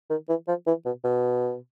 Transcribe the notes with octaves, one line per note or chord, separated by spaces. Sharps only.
D#3
E3
F3
E3
B2
B2